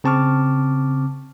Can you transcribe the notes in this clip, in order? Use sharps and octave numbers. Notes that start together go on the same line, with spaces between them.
C#3 C4 A5 C#6 D6 F6